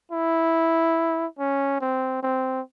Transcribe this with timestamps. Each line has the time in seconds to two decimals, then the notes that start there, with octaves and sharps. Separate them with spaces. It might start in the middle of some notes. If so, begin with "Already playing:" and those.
0.12 E4
1.39 C#4
1.81 C4
2.23 C4